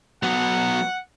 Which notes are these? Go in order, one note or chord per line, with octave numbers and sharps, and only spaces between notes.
F#3 B3 F#5